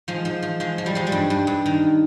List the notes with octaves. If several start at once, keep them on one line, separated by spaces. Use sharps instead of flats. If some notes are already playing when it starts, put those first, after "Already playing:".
F3 G#3
F3
F3
F3 G#3
F3
G3
F3 G#3
G3
G2
G2
G2
D#3